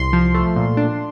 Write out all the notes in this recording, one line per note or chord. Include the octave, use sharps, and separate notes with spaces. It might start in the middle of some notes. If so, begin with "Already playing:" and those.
Already playing: C2 C6
F3
A3
A#2
D4